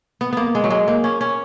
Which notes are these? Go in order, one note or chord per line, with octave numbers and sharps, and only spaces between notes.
B3
A#3 B3
G#3
F#3
G#3
A#3
C#4
C#4